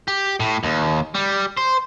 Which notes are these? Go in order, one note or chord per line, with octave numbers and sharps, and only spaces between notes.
G4
A2
D#2
G3
C5